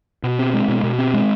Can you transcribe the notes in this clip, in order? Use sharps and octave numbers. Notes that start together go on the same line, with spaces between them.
B2
C4
G#3
B2
B2
C4
G#3